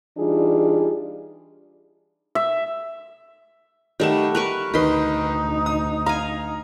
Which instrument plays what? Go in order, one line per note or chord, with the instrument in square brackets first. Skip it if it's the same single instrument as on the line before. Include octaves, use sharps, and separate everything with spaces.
[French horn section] E3 G3 D4 D#4 F4 G#4
[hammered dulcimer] E5
[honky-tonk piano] D#3 E7 [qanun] G3 A3 F#5
[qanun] A#4 B4 C#6 [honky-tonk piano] F#6
[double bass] D2 D#4 [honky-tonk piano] D#3 B4 [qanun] B5 C6
[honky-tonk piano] D#6
[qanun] F5 G#5 [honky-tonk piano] A#5